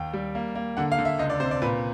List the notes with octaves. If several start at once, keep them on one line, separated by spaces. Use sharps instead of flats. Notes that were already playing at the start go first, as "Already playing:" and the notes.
Already playing: D#2 G5
G3
A#3
A#3
D3 F#5
F5
D3
E5
C#2 D#5
D5
C3 C5
D5
A#2 B4